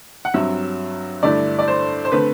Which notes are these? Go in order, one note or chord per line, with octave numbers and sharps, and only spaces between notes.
F#5
G2 F#3 C4 E5
G2 D3 A3 E4 D5
D5
C5
C5
D3 A3 C4 B4